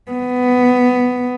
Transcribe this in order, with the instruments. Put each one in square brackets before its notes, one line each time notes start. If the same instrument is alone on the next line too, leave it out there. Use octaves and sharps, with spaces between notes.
[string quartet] B3